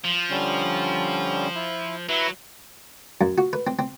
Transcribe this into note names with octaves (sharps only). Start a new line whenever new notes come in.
F3
D3 G3 C#4
E4
F#3 E4 B4
F#2
F#4
B4
C4
C4